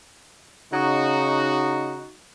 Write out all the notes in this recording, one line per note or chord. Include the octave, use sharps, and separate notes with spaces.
C#3 D#4 F#4